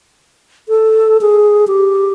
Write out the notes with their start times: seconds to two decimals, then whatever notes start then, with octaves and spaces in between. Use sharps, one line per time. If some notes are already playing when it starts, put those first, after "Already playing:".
0.69 A4
1.21 G#4
1.68 G4